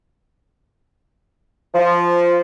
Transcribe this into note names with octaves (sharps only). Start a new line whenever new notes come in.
F3